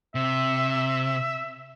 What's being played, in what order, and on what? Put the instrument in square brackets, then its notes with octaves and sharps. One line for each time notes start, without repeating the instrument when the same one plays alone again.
[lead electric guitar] C3 [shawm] E5